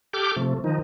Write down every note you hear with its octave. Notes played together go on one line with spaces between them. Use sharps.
G4 A4 D6 F6 G6
C3 F3 A3
D#3 F3 D#4